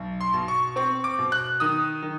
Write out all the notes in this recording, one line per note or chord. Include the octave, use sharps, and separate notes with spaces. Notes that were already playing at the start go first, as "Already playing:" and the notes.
Already playing: B1
C6
B2
C#6
C4 C#6
D6
B2
F#6
D#3 D#6
D#3